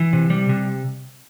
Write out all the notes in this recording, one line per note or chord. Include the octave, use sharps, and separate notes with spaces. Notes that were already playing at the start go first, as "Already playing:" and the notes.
Already playing: E3
C3
G3
C3